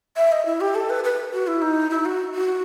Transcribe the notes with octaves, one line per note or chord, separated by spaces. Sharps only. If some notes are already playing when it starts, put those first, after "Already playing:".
E5
D#5
E4
G4
A4
B4
B4
F#4
E4
D#4
E4
F#4
F#4